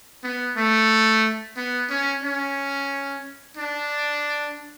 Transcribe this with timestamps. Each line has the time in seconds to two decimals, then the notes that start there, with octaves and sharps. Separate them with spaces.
0.24 B3
0.57 A3
1.57 B3
1.90 C#4
2.23 C#4
3.57 D4